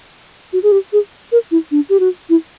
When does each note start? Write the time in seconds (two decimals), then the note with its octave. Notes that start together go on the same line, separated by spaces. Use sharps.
0.53 F#4
0.63 G#4
0.72 G4
0.93 G#4
1.32 A#4
1.51 E4
1.71 D4
1.89 G4
2.00 F#4
2.30 E4